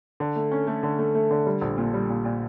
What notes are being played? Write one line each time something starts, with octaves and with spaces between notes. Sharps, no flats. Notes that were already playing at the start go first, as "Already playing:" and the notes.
D3
A3
C#4
A3
D3
A3
A3
D3
G3
A#1
A#2
G3
A#2
A#2